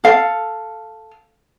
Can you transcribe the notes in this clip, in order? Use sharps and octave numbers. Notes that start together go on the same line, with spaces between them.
A4 F5